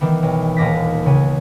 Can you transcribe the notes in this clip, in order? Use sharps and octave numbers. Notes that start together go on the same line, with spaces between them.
D#3 E3 G3 B3
B1
D#1 D#2 D6 A#6 B6
C#2 C#3 G#5